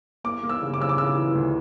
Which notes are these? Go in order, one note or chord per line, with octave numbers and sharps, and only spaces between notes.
A#3 D6
A#3
E6
C#3
D6
C#3 E6
D6
C#3 E6
E3
D2